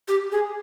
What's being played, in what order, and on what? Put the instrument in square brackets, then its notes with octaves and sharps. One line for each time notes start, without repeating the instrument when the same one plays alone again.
[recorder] G4
G#4